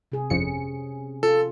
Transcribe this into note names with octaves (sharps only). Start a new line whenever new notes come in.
C3 G#4
G1 F2 C#4 C#7
F4 A4